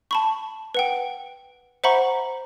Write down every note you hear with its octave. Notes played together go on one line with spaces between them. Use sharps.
A5 B5 C#6
B4 F#5 G5
C5 E5 F#5 A#5 B5 C#6